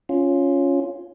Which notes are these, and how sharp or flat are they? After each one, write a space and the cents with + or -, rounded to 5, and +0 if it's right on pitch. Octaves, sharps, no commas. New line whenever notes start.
C#4 +0 F4 +0